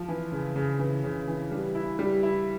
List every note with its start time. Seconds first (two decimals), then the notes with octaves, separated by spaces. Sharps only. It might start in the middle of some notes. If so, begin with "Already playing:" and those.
Already playing: F3
0.08 E3
0.32 C#3
0.56 C#3
0.79 E3
1.04 C#3
1.27 E3
1.51 G3
1.75 E4
1.99 G3
2.23 E4